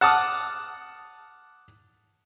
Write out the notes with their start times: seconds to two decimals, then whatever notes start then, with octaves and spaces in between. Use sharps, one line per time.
0.01 F#5 A5 D6 D#6 F6